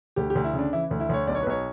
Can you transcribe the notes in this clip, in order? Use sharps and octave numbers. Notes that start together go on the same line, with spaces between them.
D2 G4
G4
D2
E4
C#3
D4
E3 E4
D2
E4
D2 C#5
B1 D5
C#5
B4
B1 C#5